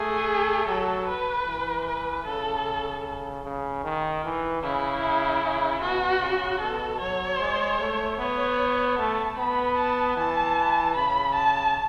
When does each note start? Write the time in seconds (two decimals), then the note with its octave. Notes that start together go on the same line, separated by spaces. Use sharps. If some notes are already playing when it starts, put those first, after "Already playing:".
Already playing: A3 G#4
0.67 F#3 A4
1.07 B4
1.47 E3
1.86 B4
2.25 C#3 A4
3.44 C#3
3.84 D#3
4.24 E3
4.63 C#3 E4
5.43 C#3
5.81 B2 F#4
6.21 C#3
6.61 B2 A4
7.00 F#3 C#5
7.39 G#3
7.80 A3
8.18 B3 C#5
8.97 A3 A5
9.38 B3 B5
9.77 A5
10.16 E3 A5
10.95 C#3 B5
11.35 A5